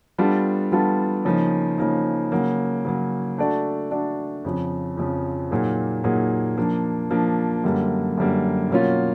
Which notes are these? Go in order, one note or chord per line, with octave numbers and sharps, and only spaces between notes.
G3 B3 D4 F4 A4
G3 B3 D4 F4 A4
C#3 F3 A#3 D#4
C#3 F3 A#3 D#4
C#3 F#3 A#3
C#3 F#3 A#3
A3 D4 F#4 A4 D5
A3 D4 F#4 A4 D5
F2 C#3 F3
F2 C#3 F3
A#2 F#3 A#3 D#4 G#4
A#2 F#3 A#3 D#4 G#4
F3 A#3 D4
F3 A#3 D4
F#2 D3 G3 A#3
F#2 D3 G3 A#3
B2 F#3 A#3 C#4 F4